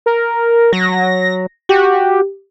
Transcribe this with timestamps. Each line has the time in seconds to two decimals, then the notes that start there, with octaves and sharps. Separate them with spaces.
0.06 A#4
0.73 F#3 A#6
1.69 F#4 G4